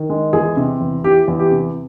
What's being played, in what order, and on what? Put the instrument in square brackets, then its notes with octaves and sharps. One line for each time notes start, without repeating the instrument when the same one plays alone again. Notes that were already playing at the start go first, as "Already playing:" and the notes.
Already playing: [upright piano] D#3
G#3
[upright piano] E2 [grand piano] G#4
[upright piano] C3
E2
[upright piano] E3 [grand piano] G4
[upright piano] E2
[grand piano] G4
[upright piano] C3